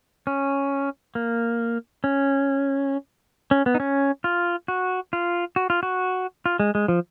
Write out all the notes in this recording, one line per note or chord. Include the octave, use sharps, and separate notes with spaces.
C#4
A#3
C#4
C#4
B3
D#4
C#4
F4
F#4
F4
F#4
F4
F#4
F4
G#3
G#3
F3